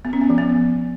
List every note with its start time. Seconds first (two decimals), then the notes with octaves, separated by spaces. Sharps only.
0.05 B3
0.13 C#4
0.21 B3
0.30 F3
0.38 B3